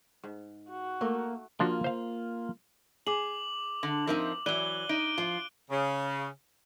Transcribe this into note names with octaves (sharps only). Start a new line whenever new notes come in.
G#2
F#4
A3 A#3
F3 A#3 D4 F4 F#4
C5 F5
G#4 D6 F#7
D3
F3 C4 D#4 A#4 E5
E3 F#3 D5 F#6 D#7 G7
D#4 D7
F3 F4
C#3